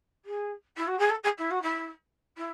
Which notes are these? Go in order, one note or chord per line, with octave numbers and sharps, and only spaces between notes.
G#4
E4
F#4
G#4
A4
G#4
E4
F#4
E4
E4